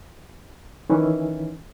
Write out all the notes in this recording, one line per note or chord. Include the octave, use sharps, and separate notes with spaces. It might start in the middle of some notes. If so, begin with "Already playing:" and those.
D#3 E3 C#4